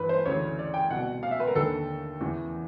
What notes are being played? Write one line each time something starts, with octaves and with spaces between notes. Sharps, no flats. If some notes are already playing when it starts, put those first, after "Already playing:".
Already playing: G2 E3 B4
C5
D2 C#3 E3 C#5
D5
G5
C2 B2 F#5
F5
E5
B4
A#4
D#2 D3 A4
E2 C#3 E3